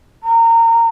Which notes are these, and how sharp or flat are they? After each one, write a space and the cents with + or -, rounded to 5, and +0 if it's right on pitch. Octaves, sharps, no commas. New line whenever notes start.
A#5 -25